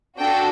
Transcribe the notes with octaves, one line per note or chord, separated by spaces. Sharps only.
D4 F#4 A4 G5